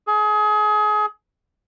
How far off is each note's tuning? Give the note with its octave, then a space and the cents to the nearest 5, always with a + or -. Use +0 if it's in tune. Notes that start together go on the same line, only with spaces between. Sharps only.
G#4 +30